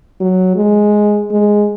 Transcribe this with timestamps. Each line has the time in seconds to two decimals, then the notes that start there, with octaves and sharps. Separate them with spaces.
0.20 F#3
0.56 G#3
1.31 G#3